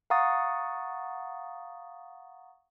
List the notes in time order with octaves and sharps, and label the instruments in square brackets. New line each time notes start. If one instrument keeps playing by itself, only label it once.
[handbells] F5 F#5 A#5 C#6 D#6 A6